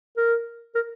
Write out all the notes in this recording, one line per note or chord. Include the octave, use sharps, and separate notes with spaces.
A#4
A#4